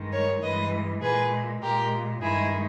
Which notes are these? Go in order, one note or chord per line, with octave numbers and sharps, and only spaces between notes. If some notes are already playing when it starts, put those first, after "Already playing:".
Already playing: G2 D#3 G#3
A#4 C#5
G2 E3 G#3 B4 D#5
A#2 G#3 G#4 B4
A#2 G#3 G4 A#4
G2 D#3 G#3 E4 G#4